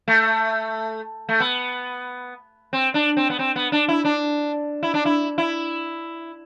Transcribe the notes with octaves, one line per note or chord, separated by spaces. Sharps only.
A3
A3
B3
C4
D4
C4
B3
C4
B3
D4
E4
D4
E4
D4
E4
E4